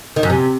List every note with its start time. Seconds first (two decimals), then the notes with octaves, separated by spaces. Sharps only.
0.16 D#3
0.23 F#2
0.30 C3